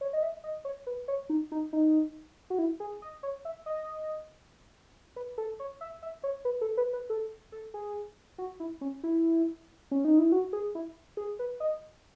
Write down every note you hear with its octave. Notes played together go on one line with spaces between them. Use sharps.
C#5
D#5
E5
D#5
C#5
B4
C#5
D#4
D#4
D#4
F#4
E4
G#4
D#5
C#5
E5
D#5
B4
A4
C#5
E5
E5
C#5
B4
A4
B4
B4
A4
A4
G#4
F#4
E4
C#4
E4
C#4
D#4
E4
F#4
G#4
E4
G#4
B4
D#5